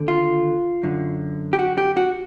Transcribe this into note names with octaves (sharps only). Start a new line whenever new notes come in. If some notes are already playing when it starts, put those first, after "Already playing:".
Already playing: D#2 D3
F4
F#2 D3
G4
F#4
G4
F#4